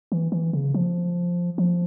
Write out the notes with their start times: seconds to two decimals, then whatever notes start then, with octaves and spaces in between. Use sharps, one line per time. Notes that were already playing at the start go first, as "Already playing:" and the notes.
0.12 E3
0.32 E3
0.53 C#3
0.74 F3
1.58 F3